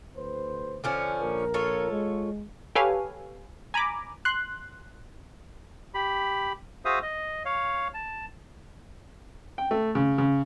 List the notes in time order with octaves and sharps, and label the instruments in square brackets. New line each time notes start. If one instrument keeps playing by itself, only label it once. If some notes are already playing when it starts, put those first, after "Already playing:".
[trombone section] D2 B4 C5
[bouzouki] D3 F3 C#4
[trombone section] A#1 A#4
[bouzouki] F4 A4 C#5
[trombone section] G#3
[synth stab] G4 A4 B4 C#5 F5 G#5
G#5 A#5 B5 D6
C6 F#6
[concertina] G4 B5
F#4 G#4 C5 E5 F5 D#6
D#5
C#5 F5
A5
[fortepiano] G5
A3
C#3
C#3